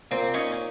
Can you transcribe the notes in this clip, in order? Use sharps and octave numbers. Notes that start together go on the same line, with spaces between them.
A#2 C4
C#4 D#4